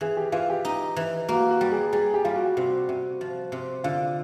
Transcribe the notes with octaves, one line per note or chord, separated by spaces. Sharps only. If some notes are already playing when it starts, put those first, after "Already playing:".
E3 G#4
G4
E3 F4
G4
D#4
E3
A#3 F#4
F#4
G3
G#4
G3 G#4
G4
G3 F4
F#4
C3 F#4
C3
F3
C3
D3 F4